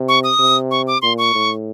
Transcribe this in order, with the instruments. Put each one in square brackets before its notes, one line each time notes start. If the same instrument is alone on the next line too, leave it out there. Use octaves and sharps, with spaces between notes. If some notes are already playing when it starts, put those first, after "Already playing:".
Already playing: [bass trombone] C3
[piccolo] C#6
D#6
[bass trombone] C3
[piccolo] C#6
D6
[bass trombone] A#2 [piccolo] C6
[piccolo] C#6
[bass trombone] A2